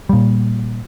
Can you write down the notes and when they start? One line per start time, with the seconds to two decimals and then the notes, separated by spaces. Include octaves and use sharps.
0.09 A#2 G3